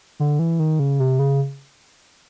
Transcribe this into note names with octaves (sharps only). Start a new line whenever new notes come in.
D3
E3
D#3
C#3
C3
C#3